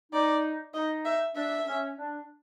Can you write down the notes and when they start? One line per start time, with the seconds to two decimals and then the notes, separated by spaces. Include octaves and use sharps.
0.12 D#4 D5
0.74 D#4 D#5
1.05 E5
1.35 D4 E5
1.67 C#4
1.97 D4